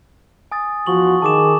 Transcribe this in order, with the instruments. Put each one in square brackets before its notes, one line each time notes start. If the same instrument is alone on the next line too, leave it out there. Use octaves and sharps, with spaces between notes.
[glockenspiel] G#5 D#6 A6
[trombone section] E2 F3 F#4 [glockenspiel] C#6 F#7
[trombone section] D#3 G#4 [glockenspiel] A5 D6 E7